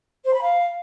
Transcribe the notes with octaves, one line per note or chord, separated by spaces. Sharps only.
C5
B5
F5